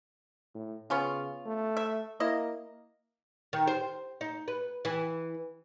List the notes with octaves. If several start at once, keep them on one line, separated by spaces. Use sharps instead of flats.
A2
C#3 B3 C#4 F4
A3
E5
A#3 E4 D#5
D#3
C5
D#4
B4
E3